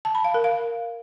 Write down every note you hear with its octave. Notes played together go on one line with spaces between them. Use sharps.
A5
B5
F5
A#4
F5